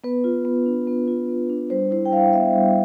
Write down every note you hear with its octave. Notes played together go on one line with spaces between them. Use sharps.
B3 B4
F4
B3
D4
B3
F4
B3
D4
G3 C5
E4 C5
G5
G3 F5
B3 E5
G3